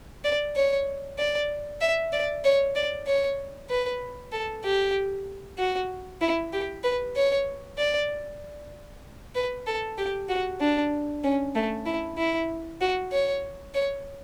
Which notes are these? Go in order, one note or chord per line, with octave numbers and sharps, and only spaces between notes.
D5
C#5
D5
E5
D5
C#5
D5
C#5
B4
A4
G4
F#4
E4
G4
B4
C#5
D5
B4
A4
G4
F#4
D4
C#4
A3
E4
E4
F#4
C#5
C#5